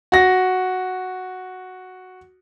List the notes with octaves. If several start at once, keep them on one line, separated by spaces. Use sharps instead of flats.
F#4 A#6